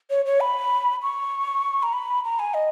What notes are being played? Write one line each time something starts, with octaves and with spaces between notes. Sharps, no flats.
C#5
C#5
B5
C#6
A#5
B5
A#5
G#5
D#5